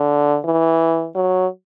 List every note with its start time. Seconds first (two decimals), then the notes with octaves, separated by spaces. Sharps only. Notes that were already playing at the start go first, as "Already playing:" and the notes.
Already playing: D3
0.45 E3
1.15 F#3